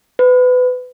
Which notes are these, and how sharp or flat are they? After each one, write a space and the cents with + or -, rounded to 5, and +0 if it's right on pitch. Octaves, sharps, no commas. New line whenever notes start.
B4 +25